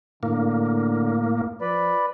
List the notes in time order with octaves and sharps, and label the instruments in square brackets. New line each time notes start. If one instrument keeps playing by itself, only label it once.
[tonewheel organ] A2 A#3 [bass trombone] D3
[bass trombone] F3 [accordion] B4 D5 B5